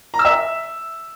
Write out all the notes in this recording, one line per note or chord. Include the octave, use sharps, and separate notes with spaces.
A#5
E6
E5